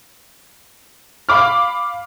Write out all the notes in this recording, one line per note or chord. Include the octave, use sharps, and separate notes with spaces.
F5 B5 D6 F6